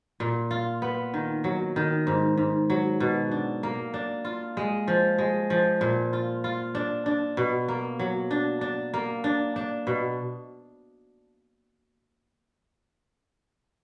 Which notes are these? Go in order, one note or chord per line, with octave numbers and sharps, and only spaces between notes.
A#2
F4
B3
D#3
F#3
D#3
G#2
G#2
F#3
B2
D4
A#3
D4
F4
G#3
F3
G#3
F3
A#2
F4
F4
D4
D4
B2
A#3
F#3
D4
D4
A#3
D4
D4
B2